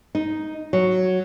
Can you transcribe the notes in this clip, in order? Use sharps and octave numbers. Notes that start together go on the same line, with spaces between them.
D#4
F#3